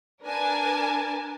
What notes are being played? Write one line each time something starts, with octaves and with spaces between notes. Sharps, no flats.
D4 A#4 B4 G#5 A5